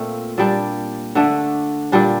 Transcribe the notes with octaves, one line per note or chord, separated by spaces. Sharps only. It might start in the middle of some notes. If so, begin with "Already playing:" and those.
Already playing: A#2 A3 C4 F4
A#2 G3 D4 D5
D3 A3 D4
A#2 G3 D4